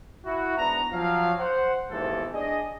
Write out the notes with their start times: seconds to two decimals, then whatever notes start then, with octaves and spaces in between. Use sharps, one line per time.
0.25 E4 F#4
0.57 G#2 B3 D4 A#5
0.92 F3 F#3 F5
1.39 C5 F#5
1.91 D#2 G#2 B2 E3 C4 A4
2.33 D4 G#4 D5 D#5